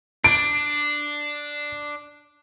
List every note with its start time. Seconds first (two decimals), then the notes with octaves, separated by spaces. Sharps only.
0.24 D4 D7